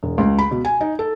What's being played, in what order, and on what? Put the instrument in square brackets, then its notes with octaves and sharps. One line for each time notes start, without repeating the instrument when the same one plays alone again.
[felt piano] E1
C#2
B5
B2
G#5
D#4
A4